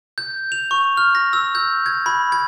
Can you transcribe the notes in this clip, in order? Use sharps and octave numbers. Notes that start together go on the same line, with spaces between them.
G6
F7
C#6
F6
A#6
E6
G6
G#6
B5
G#6